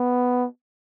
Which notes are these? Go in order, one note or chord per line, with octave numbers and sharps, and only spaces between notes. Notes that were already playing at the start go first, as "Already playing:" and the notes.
Already playing: B3